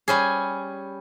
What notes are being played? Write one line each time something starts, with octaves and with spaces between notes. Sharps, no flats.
G3 C#4 G#4